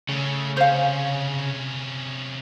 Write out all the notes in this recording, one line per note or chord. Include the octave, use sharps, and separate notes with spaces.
C#3 A3 C#5
C3 C#4 C5 F5